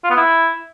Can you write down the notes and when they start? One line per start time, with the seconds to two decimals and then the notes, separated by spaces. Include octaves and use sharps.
0.04 F4
0.10 B3
0.17 E4